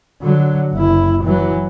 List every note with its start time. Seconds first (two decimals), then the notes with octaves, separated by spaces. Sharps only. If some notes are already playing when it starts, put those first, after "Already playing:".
0.22 D3 F#3
0.73 F#1 E4
1.23 E3 F#3